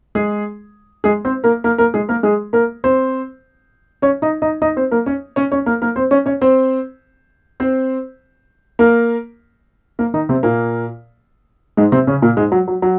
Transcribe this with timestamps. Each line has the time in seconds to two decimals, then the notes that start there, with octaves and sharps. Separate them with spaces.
0.15 G#3 G#4
1.04 G#3 G#4
1.25 C4 C5
1.44 A#3 A#4
1.64 A#3 A#4
1.78 A#3 A#4
1.94 G#3 G#4
2.09 A#3 A#4
2.23 G#3 G#4
2.53 A#3 A#4
2.84 C4 C5
4.02 C#4 C#5
4.22 D#4 D#5
4.42 D#4 D#5
4.62 D#4 D#5
4.77 C4 C5
4.91 A#3 A#4
5.06 C#4 C#5
5.36 C#4 C#5
5.52 C#4 C#5
5.66 A#3 A#4
5.82 A#3 A#4
5.96 C4 C5
6.11 C#4 C#5
6.26 C#4 C#5
6.41 C4 C5
7.60 C4 C5
8.79 A#3 A#4
9.99 A#3 A#4
10.14 D#3 D#4
10.29 C3 C4
10.43 A#2 A#3
11.77 G#2 G#3
11.92 C3 C4
12.07 C#3 C#4
12.22 A#2 A#3
12.37 G#2 G#3
12.52 F#3
12.68 F#3
12.82 F#3